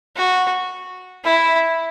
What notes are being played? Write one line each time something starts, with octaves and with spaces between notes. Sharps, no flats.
F#4
E4